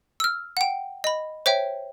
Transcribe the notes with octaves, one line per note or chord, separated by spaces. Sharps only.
E6 F6
F#5 G5
D#5 B5
C5 C#5 E5 G5